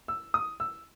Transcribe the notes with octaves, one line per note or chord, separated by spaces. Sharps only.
E6
D#6
E6